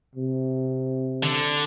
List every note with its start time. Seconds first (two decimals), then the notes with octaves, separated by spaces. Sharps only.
0.15 C3
1.23 D3